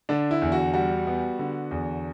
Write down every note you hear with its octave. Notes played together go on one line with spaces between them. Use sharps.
D3 D4
E4
E2
F#4
G3 F#4
B3
D3
E2